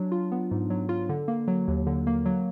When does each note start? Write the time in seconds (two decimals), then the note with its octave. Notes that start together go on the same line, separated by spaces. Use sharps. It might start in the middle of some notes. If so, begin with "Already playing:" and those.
Already playing: F#3 D4
0.12 F4
0.32 B3
0.51 G#2
0.70 F#3
0.89 F4
1.09 D3
1.28 A#3
1.48 F#3
1.68 D#2
1.87 D3
2.07 A#3
2.26 F#3